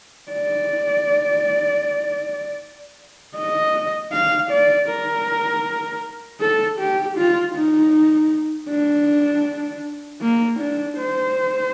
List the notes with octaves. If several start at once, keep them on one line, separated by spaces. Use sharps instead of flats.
D5
D#5
F5
D5
A#4
A4
G4
F4
D#4
D4
A#3
D4
C5